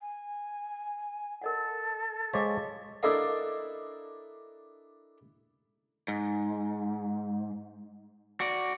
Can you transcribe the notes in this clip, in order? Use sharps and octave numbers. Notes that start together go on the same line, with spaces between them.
G#5
A4 A#4 D#5 F#5
G#3 C5 C#5 F5 D6
D4 E4 A4 A#4 D#5 F5
G#2
F#4 D5